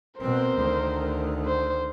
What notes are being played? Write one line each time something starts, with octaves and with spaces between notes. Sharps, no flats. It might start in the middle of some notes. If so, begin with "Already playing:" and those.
B2 C4 A#4 C5
D2 D#3
C5